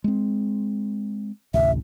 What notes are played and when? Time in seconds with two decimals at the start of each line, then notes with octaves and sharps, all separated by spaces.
0.04 G#3 C4
1.54 A1 D2 C3 E5